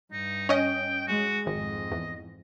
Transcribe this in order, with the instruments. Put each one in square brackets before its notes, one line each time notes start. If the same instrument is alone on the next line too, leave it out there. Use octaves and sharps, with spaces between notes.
[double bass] G2 [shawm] D#4
[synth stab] C#4 D#5 [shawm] G5
[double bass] G#3 [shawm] F#4
[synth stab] G#1 [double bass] F2 G#2 [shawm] D#5
[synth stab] E2